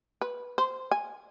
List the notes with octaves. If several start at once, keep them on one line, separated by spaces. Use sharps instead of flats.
B4
C5
G#5